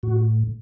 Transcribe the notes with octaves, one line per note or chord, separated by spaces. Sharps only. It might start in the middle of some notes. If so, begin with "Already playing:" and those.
A2 F#4